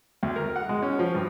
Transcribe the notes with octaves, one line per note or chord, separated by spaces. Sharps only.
D2
A#4
F#5
G#3
C#4
F3
G2